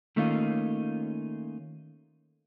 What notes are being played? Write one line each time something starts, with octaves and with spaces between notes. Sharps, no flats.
D#3 A3 A#3 C#4 D#4 F4